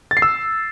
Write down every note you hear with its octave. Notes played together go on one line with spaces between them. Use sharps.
A6
C7
E6